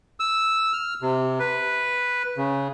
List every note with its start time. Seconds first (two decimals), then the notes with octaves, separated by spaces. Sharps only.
0.20 E6
0.73 F6
1.02 C3
1.39 B4
2.37 C#3